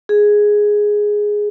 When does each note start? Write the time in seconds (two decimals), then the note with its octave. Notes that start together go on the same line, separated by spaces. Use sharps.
0.09 G#4